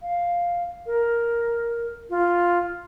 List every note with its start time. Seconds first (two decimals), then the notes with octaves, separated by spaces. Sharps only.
0.02 F5
0.86 A#4
2.10 F4